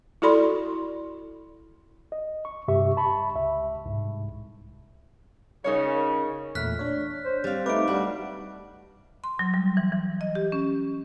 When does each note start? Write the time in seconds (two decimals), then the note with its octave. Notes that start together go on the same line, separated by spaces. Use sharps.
0.22 E4 F#4 A4 D5 B5 C6
2.12 D#5
2.45 C#6
2.68 G2 C3 G4 E5 C#6
2.97 A5 B5 C#6
3.35 C#2 E5
3.86 C2 G#2
5.64 C#3 D#4 A#4 C#5
6.55 E2 A#2 A3 F6 F#6 B6
6.79 D4 C#5
7.25 C5
7.44 G3 C4 F5
7.66 A3 D#4 B4 D6 D7
7.87 G3 D4 F#4
9.24 C6
9.39 F#3
9.54 G3
9.77 E3
9.92 E3
10.21 D#5
10.35 G4
10.52 C#4